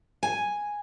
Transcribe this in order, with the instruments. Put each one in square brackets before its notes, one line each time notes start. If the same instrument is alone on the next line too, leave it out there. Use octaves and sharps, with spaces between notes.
[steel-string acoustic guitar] G#5